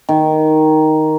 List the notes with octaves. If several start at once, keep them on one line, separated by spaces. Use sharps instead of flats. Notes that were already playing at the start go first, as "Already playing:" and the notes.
D#3